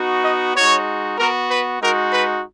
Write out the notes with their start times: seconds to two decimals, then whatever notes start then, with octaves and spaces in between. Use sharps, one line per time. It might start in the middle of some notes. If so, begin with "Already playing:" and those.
Already playing: B3 D#4 F#4
0.24 D#5
0.56 G#3 D#4 F#4 C#5
1.18 B3 F#4 A#4
1.50 B4
1.81 G#3 D#4 F#4 A#4
2.12 B4